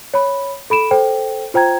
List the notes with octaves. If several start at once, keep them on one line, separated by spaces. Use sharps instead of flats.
C#5 B5
A4 B5 D7 E7
A4 C5 G5
F4 C5 G5 A#5 G#6